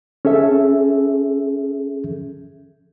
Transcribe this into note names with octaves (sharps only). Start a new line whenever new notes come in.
C#4 G#4 A4 E5